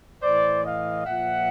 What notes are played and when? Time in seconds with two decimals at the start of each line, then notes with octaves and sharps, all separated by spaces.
0.22 A2 E3 C5 D5
0.64 D#5 F5
1.06 A#2 F3 E5 F#5